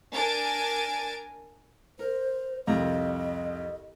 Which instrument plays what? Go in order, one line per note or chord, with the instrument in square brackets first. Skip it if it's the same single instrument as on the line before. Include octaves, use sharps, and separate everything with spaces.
[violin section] D4 A#4 G#5 A6 D7
[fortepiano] A#4 [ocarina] C5
[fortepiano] C2 F2 A#5 [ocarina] D#5